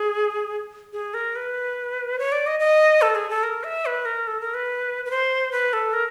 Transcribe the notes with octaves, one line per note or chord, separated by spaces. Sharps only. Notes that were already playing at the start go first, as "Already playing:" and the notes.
Already playing: G#4
G#4
A#4
B4
C#5
D5
D#5
D#5
A4
G#4
A4
A#4
E5
B4
A#4
A4
A#4
B4
B4
C5
B4
A4
A#4